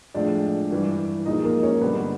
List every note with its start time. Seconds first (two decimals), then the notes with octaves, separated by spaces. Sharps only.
0.14 A2 F3 G#3 D4 D5
0.71 G2 E3 G3
1.25 A#2 F3 G#3 D#4 D#5
1.44 A#3 A#4
1.63 C#4 C#5
1.81 G2 D3 G3 B3 B4